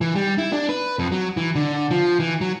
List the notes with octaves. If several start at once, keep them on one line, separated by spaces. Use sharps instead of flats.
E3
G3
E4
D4
B4
F2
F#3
E3
D3
F3
E3
F#3